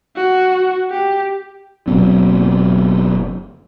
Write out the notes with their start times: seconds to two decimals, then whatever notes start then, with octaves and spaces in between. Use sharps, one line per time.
0.16 F#4
0.90 G4
1.88 F#1 B2 F#3 C4